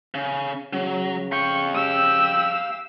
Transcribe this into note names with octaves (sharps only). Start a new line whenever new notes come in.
C#3
C#3 F#3
F5 G5 C#6
G4 E6